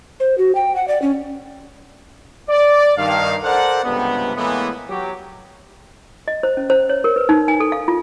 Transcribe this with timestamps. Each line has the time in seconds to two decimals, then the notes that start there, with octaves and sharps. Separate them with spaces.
0.20 C5
0.38 F#4
0.55 G5
0.76 F#5
0.88 D5
1.02 C#4
2.49 D5
2.97 G2 D#3 F5
3.43 A4 A#4 C5 D5 F#5
3.84 C#2 G2 C3 G3 B3
4.36 A2 E3 G#3 A#3 B3
4.89 F#3 G4
6.28 D#5
6.43 C5
6.57 C#4
6.70 C5
6.89 C#5
7.04 A#4
7.16 B4
7.29 D#4
7.48 G#5
7.60 A4
7.72 F5
7.88 F4